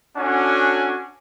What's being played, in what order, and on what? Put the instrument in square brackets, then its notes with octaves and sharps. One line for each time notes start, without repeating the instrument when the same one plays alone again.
[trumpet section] C#4 D4 F#4 A4 F#5 G#5